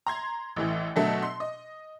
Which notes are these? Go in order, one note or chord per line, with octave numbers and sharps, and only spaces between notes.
A#5 C6 G#6
A1 A2 E3
B2 D3 F#3 A3 A4
C6
D#5